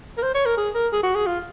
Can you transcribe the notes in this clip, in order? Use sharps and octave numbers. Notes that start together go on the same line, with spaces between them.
A#4
C5
C#5
A#4
G#4
A#4
G#4
F#4
G#4
F4